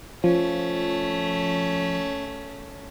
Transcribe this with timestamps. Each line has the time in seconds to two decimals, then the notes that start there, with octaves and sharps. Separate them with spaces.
0.24 F3 A3 C#4